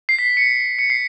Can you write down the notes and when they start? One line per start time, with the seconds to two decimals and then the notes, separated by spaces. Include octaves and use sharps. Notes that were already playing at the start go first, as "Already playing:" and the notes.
0.09 C7
0.19 B6
0.37 C#7
0.79 C#7
0.90 C7